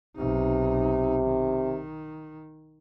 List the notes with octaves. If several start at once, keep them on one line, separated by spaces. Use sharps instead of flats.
B1 C3 D#4
D#3